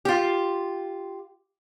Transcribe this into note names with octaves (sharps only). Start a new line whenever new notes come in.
F4 G4